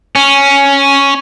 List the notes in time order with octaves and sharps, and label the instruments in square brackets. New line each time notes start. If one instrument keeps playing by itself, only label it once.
[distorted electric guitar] C#4